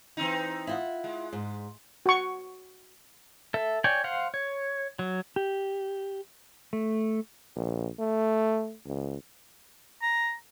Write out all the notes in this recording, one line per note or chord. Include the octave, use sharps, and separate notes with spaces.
E3 C4 D#4
E4 F4 F#5
G#3
G#2
F#4 C#6
A4 E5
C#5 D5 G5 G#5
C5 F5 F#5
C#5
F#3
G4
A3
A#1
A3
C#2
A#5